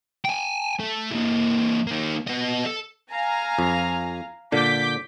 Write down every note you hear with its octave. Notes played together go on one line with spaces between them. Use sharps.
G5 G#5
A3
E3 A#3
A#3 D#4
B3 D#5
A4
F5 G#5 A#5
F2
A#2 D3 D6 G6 B6